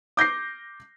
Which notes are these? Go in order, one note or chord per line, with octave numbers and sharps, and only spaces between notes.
D6 G6 A#6 C7